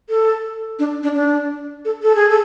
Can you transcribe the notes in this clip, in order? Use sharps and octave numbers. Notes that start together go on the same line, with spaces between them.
A4
D4
D4
D4
A4
A4
G#4
A4